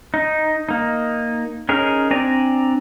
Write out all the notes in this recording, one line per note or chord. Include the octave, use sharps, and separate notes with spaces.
D#4
A#3 D#4
C#4 D#4 G#4 A#4
C4 D4 D5 G#5 A#5